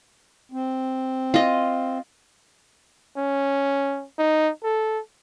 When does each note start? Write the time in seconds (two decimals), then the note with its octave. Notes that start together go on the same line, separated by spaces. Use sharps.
0.52 C4
1.34 F4 D#5
3.17 C#4
4.19 D#4
4.64 A4